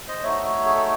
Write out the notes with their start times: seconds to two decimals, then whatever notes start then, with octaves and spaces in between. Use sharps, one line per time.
0.08 C5 D#5
0.23 A3 D#4 F#4 C#5 E5
0.66 G#4
0.76 A4